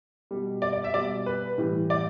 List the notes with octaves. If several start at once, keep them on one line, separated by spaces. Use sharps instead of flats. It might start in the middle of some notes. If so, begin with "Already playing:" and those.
B2 G3
D5
D5
E5
B2 G3 D5
B4
A2 E3 G3
D5